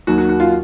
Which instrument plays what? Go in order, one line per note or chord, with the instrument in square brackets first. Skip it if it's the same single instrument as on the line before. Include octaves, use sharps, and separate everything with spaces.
[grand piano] D#2 D#3 F#3 F#4
F#4
F#4
F4